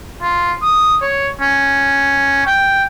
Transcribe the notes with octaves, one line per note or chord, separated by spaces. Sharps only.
F4
D#6
C#5
C#4
G5